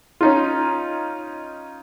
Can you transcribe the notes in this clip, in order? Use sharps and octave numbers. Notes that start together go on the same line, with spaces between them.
C#4 D#4 F4